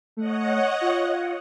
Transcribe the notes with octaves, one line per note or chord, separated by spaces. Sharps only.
A3 C#5 D#5 F#5
F4